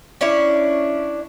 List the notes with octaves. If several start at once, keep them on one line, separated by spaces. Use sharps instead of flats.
C#4 D4 E4